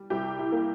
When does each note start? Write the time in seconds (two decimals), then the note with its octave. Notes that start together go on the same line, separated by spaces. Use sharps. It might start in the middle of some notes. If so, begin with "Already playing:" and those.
Already playing: G3
0.10 C2 E4 G4
0.39 E4
0.52 A#3